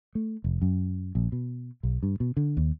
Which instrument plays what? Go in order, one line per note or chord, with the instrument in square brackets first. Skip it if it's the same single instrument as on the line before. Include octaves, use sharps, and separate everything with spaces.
[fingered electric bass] A3
F1
F#2
A#1
B2
B1
G2
B2
D3
D#2